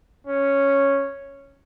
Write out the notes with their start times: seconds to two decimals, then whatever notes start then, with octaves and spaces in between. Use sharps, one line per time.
0.27 C#4